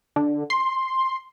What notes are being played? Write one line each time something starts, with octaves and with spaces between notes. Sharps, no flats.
D3
C6